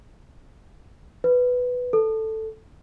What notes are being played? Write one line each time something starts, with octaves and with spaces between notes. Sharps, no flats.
B4
A4